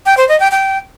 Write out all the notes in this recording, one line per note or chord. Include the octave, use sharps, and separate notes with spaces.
G5
C5
D#5
G5
G5